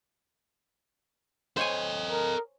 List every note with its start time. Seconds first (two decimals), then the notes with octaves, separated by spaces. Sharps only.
1.57 A4 C5 C#5 D#5 G#5
2.10 A#4